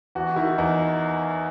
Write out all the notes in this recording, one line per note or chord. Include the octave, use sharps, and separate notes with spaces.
E2 F#4
D#3 E4
E2 D#4